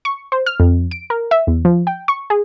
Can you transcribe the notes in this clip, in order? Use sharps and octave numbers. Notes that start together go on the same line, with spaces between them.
C#6
C5
F6
F2
D7
A#4
E5
E2
F3
G5
C#6
G#4